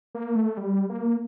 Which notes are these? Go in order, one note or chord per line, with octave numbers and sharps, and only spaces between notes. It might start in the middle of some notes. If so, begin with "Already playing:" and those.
A#3
A3
G3
A#3